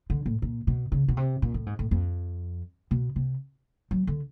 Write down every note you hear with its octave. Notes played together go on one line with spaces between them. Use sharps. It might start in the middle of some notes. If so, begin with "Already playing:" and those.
D3
A2
A#2
B2
C#3
B2
C3
A#2
A2
G#2
A2
F2
B2
C3
F#3
D3